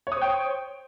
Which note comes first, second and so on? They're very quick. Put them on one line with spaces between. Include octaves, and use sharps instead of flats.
C#5 D#6 C5 G5